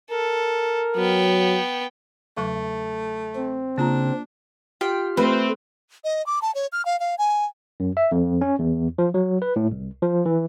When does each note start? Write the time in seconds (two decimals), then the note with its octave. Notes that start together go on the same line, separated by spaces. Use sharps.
0.11 A4 A#4
0.97 F#3 B3 G5
2.37 E2 C#3 F#3 A3
3.35 C4
3.78 C#3 A#3 D4 F4 A#5
4.81 F4 G4 G5 F6
5.17 A3 C4 B4
6.04 D#5
6.26 D6
6.42 A5
6.55 C#5
6.73 F6
6.85 F5
7.00 F5
7.18 G#5
7.80 F#2
7.97 E5
8.12 F2
8.41 C#4
8.59 E2
8.98 F3
9.14 F#3
9.42 B4
9.56 A2
9.71 C2
10.02 F3
10.26 E3